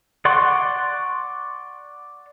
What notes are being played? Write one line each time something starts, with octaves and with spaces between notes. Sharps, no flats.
D5 F#5 C6 C#6